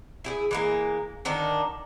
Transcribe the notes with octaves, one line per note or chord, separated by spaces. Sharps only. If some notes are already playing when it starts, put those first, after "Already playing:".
E4 G4 G#4
E3 G#3 A#3
D3 D#3 D4 D#4